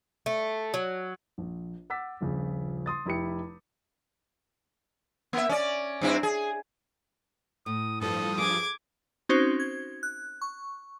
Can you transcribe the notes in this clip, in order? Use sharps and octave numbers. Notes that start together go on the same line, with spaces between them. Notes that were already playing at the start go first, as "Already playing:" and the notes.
A3
F#3
A#1
F#5 D6 E6 A6 B6
D#1 A#1 C#3
C6 D#6 A6
F1 E4 G4 B5 C#7
A#3 E5
C#4 D5
G2 C4 E4
G#4
A2 D#6
G2 F3 A4 D#6
G#4 D6 G#6
C4 C#4 D#4 F#4 C5
G#6
F#6
C#6